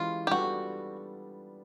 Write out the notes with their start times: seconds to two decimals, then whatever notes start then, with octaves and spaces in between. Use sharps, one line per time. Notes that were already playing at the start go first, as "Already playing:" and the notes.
Already playing: E3 G#3 C#4 E4 F4 G4
0.27 G4
0.31 G3 B3 D4 F4 F#4 A4